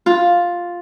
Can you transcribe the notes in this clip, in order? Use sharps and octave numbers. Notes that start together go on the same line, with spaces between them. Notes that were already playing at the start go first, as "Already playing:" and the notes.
F4